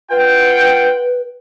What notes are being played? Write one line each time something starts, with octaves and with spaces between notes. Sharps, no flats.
F4 B4 F#5 G5